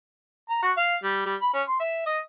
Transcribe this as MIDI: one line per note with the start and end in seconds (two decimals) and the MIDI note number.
0.49 0.59 82
0.62 0.72 66
0.77 0.96 77
1.03 1.21 55
1.26 1.35 55
1.41 1.49 83
1.53 1.62 61
1.68 1.78 84
1.80 2.06 76
2.06 2.19 75